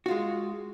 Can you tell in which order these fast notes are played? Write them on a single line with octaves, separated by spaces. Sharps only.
F#4 F4 G#3